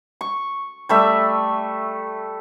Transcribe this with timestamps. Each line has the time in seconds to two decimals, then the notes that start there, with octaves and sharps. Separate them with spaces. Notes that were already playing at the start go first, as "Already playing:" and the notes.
0.21 C#6
0.89 G3 A3 E5